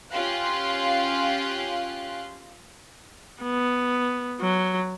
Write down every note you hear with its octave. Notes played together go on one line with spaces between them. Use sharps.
C#4 F4 G4 F5 C6 F#6
B3
F#3